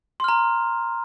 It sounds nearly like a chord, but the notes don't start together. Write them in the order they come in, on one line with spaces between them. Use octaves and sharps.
C6 F6 A#5